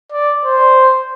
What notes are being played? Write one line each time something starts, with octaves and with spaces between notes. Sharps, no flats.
D5
C5